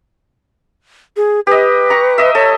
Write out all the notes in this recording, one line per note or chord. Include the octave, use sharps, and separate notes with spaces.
G#4
G4 B4 D#5
A#5 C#6
D#5 E5
A4 C#5